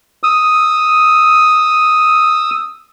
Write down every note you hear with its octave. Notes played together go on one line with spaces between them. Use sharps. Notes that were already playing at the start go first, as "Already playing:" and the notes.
D#6 E6